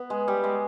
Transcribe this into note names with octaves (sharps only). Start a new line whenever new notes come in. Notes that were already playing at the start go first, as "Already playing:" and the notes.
Already playing: B3
G#3
G3
G#3